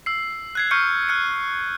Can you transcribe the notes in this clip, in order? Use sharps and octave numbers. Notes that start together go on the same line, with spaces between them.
E6 C7
F#6 G#6 C7
C#6 F6 G6 C#7
F6 F#6 C#7